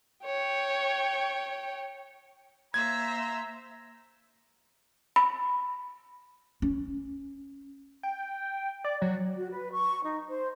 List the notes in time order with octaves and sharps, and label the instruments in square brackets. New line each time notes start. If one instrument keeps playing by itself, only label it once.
[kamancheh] C#5 G5
[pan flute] A#3 [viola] C5 E5 [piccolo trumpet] A#5 [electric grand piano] G#6
[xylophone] B5
[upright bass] C#4
[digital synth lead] G5
D5
F#3
[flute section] F#4
B4
C#6
D#4
C5